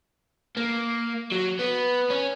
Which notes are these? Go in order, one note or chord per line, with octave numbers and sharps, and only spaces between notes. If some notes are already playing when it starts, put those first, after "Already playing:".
A#3
F#3
B3
C#4